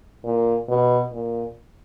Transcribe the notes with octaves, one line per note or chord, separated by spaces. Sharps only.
A#2
B2
A#2